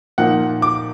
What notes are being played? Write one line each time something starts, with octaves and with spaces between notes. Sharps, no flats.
A#2 F3 A#3 D#4 F#5
D6